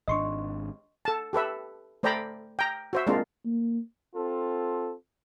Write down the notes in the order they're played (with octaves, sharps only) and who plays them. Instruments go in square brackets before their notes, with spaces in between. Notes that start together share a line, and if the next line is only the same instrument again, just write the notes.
[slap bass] G#1 G#2 D4 [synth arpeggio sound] D#5 C6 C#6
[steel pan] A4 A5
G4 A4 B4 E5
A3 C5 D5 G5 A#5 B5
G5 A#5
F#4 C5 E5
G#3 A#3 C4 D4 F4 A#4
[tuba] A#3
[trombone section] C4 F4 A4